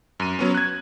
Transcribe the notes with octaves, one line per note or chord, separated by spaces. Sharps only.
F#2 D#7
F#3 B3 C#4
F#6 G#6